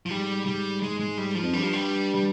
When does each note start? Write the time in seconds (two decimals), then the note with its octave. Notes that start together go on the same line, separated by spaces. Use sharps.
0.06 F3
0.11 G#2 G3
0.46 G3
0.82 G#3
0.99 G#3
1.18 G3
1.35 F3
1.43 F2
1.53 G2 G3
1.63 F3
1.73 G3
2.15 G3